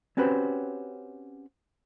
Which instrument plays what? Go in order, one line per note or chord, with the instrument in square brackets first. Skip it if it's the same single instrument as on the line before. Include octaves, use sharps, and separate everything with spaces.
[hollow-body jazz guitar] C4 C#4 F#4 G4 B4 C5